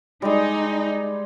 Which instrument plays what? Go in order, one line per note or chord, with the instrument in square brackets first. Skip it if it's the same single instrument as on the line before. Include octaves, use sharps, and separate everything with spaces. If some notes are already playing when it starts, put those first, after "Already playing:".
[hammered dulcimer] G3 G#3 [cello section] D#4